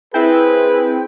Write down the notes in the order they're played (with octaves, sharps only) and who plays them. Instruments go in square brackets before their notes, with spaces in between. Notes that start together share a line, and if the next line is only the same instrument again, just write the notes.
[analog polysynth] C4 E4 [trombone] G#4 [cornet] B4 [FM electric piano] G5 G6